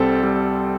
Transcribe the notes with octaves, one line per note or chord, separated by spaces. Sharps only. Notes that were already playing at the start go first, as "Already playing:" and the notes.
Already playing: C2 G3 C4 A4
G3